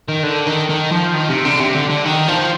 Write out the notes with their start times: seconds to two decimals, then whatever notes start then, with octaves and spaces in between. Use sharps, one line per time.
0.09 D#3
0.23 D3
0.47 D#3
0.69 D#3
0.92 F3
1.14 D#3
1.30 C3
1.45 D3
1.60 C3
1.75 D3
1.90 D3
2.05 D#3
2.28 F3